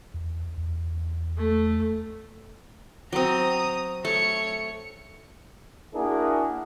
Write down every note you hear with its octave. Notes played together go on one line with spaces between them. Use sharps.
E2
E2
A3
F#3 C4 A#5 D#6
A3 C#5 C#7
A#3 D4 E4 F#4 G#4 A#4